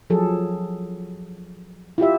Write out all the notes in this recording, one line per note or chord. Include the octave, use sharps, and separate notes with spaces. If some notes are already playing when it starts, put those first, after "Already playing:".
F3 F#3 G#4 A4
E4 F4 G4 E5